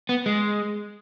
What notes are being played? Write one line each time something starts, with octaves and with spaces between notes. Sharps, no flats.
B3
G#3